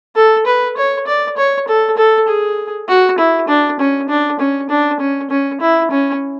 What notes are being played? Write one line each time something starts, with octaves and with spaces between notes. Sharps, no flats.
A4
B4
C#5
D5
C#5
A4
A4
G#4
F#4
E4
D4
C#4
D4
C#4
D4
C#4
C#4
E4
C#4